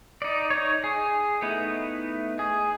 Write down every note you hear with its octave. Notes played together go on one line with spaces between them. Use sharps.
D#4 D5
D#4 C#5
G#4
A3 B3 D#4 E4
G#4